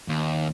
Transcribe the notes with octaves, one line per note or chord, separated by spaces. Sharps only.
D#2